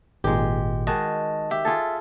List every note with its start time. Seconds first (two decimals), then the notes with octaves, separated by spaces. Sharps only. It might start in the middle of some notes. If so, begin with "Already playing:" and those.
0.24 G#1 A#2 G#3 G4
0.87 D#3 G#3 F#4 D#5 A5
1.51 G4 E5
1.65 F4 G#4 A4